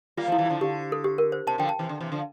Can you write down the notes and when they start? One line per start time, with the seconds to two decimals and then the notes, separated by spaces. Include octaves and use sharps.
0.17 G3 A#3 F4
0.28 F3 A3 E4
0.38 E3 G3
0.46 D3 F3 E4
0.61 D3 G4
0.92 A4
1.04 G4
1.18 A#4
1.32 C5
1.47 C3 A5
1.58 D3 F3 G5
1.69 A5
1.79 C3 E3
1.89 D3
2.00 C3 E3
2.12 D3 F3